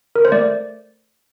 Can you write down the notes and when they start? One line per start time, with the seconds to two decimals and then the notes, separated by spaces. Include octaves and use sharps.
0.16 A#4
0.25 C5
0.32 A3 D5